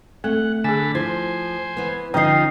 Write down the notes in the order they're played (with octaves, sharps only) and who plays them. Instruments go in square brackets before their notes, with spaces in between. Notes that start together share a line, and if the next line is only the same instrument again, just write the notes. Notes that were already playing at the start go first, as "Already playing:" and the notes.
[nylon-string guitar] A3 [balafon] C4 [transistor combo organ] F#5
[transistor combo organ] D3 A5 B5 [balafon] G#4 G#5
[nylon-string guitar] F3 [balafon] E4 [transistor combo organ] C5 G#5
[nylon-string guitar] E3 B3
[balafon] D3 [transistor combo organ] F3 D#4 [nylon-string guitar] C#4 D#5 [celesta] G5 D#6 C7